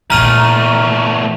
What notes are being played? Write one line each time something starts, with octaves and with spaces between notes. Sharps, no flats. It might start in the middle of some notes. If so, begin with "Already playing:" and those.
E2 A#2 A3 A#3 A#5 F6 D#7